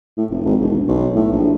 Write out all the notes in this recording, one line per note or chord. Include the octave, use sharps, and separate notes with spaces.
A2
F1
G#1
E1
B1
A2
A#1